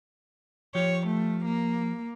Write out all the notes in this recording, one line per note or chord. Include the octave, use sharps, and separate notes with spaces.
F3 G4 C#5
A3
A#3